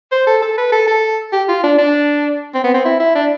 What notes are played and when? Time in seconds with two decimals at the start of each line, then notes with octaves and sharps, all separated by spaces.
0.12 C5
0.27 A4
0.42 A4
0.58 B4
0.72 A4
0.88 A4
1.33 G4
1.49 F4
1.64 D4
1.78 D4
2.55 C4
2.64 B3
2.74 C4
2.85 E4
3.00 E4
3.15 D4